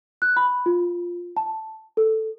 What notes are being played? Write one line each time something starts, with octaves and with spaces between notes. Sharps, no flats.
F#6
B5
F4
A5
A4